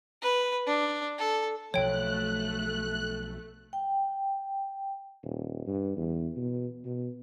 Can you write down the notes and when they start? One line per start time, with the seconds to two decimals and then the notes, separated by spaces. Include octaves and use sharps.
0.22 B4
0.67 D4
1.19 A4
1.74 B1 F3 A3 C#5 G5 F#6
3.73 G5
5.23 D#1
5.67 G2
5.97 E2
6.37 B2
6.85 B2